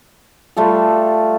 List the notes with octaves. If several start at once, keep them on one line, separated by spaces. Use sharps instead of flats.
G3 A3 F4 A4